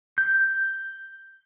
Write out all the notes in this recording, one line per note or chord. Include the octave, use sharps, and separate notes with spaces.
G6